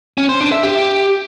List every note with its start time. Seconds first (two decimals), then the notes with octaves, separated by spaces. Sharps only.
0.18 C#4
0.29 C5
0.40 D4
0.52 E5
0.63 G4